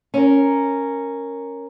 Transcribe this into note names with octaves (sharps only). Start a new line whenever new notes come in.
C#4 A#4